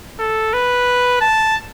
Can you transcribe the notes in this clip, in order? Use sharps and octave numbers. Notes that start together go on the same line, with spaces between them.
A4
B4
A5